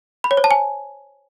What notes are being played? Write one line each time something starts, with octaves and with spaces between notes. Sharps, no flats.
B5
C#5
C5
A5
G#5